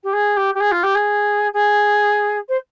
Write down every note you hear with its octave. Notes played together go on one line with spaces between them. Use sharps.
G4
G#4
G4
G4
G#4
F4
G4
G#4
G#4
C5